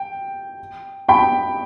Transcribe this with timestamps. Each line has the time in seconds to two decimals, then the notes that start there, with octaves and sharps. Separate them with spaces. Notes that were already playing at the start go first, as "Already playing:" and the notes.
Already playing: G5
1.08 G5 B5